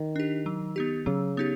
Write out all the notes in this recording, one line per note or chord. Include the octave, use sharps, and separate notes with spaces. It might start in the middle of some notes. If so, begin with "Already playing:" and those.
Already playing: D#3
D4 G4
F#3
B3 D#4 G4
C#3 F#3
B3 D#4 G4